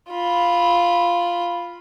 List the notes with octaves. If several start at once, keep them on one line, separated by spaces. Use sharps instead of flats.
F4 B5